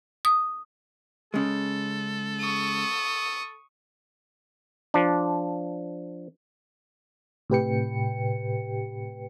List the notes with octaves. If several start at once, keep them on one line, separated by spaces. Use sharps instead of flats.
D#6
C#3 G#3 A4
C#6 D#6
F3 D4
A2 C3 G4 B4 G5 C#7